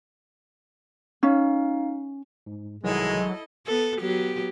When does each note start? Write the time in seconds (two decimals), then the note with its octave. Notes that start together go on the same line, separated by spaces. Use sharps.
1.23 C#4 D#4 F5
2.46 G#2
2.84 C2 D#3 E3 F#3 G#3 E4 A4 D#5
3.67 B3 A4
4.00 F#3 B3 G4